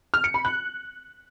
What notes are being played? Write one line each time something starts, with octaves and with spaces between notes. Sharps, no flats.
F6
C#7
B5
F#6